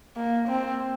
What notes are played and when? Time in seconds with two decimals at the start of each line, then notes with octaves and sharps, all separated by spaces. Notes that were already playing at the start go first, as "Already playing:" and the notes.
0.17 A#3
0.48 C4